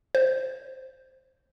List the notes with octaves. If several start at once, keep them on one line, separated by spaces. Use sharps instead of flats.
C5